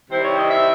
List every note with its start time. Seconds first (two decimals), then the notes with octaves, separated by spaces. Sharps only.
0.09 C3 D#3 G3 C4 E4 C5
0.23 C#5
0.37 D#5
0.50 E5